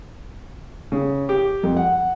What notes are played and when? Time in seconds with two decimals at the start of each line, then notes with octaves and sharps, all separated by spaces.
0.92 C#3
1.29 G4
1.63 F2
1.77 F#5